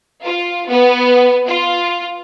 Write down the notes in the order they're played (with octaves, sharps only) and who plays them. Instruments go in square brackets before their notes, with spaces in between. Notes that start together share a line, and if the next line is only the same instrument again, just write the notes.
[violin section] F4
B3
F4